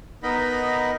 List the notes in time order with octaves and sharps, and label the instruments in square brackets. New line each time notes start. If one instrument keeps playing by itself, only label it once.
[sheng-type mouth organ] B3 D#4 A#4 D#5 B5